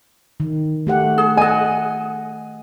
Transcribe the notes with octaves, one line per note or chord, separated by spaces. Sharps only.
D#3
A3 G4 F#5
G#4
G#4 D#5 F#5 G#5